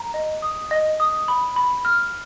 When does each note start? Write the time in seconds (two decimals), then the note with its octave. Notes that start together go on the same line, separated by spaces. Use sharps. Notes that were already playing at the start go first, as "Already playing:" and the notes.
Already playing: A#5
0.14 D#5
0.42 D#6
0.71 D#5
1.00 D#6
1.28 B5
1.56 B5
1.85 F6